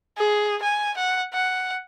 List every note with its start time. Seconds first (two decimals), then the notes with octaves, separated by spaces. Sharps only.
0.17 G#4
0.62 G#5
0.97 F#5
1.34 F#5